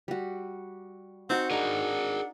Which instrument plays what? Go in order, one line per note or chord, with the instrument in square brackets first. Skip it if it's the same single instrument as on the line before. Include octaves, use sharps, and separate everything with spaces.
[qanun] G3 F#4
[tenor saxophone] C4 [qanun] D#4 F#4 [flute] F#5
[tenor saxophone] D4 [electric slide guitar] G#4 A#4 [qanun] D#5 A#5